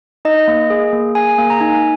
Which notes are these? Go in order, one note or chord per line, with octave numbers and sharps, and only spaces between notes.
D#4 D#5
A#3
G#4
A#3
G#4 G#5
A#3
A#5
D#4 G#5